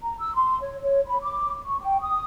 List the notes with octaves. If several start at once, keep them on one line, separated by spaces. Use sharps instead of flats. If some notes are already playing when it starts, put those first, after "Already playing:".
A#5
E6
C6
C#5
C#5
B5
D6
C#6
G5
D#6